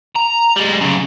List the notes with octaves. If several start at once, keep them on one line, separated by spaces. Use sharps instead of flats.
A#5
G3 G#3
F#2 C#3